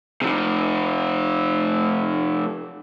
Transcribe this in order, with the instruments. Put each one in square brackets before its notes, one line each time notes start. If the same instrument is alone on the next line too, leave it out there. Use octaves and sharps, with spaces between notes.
[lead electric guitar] C3 F3